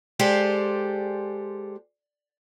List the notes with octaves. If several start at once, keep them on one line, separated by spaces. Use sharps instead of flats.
G#3 G4 A4 C5 D5